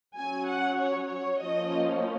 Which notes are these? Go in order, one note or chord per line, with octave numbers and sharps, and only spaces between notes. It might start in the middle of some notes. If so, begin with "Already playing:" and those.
F#3 C#4 G#5
F#5
C#5
C#5
F3 A#3 C#4 D#5